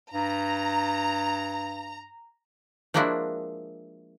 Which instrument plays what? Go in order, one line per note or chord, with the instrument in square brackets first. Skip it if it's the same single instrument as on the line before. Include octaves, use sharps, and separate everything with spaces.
[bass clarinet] G2 [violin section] A#5
[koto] F3 G#3 A#3 D4 E4 F#4